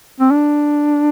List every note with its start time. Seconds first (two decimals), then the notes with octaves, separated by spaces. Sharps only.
0.20 C4
0.31 D4